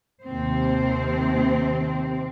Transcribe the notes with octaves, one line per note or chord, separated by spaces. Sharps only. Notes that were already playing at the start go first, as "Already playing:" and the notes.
D#2 C3 C4 C5